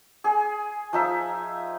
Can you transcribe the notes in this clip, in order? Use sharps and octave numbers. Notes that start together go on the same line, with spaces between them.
G#4 G#5
F3 D#4 E5